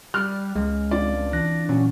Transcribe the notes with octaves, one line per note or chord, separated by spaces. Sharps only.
G3 F6 F#6
C#2 G#3
C4 D4 F4 D5
E3 D4 F#6 A#6
A#2 F#3 C#4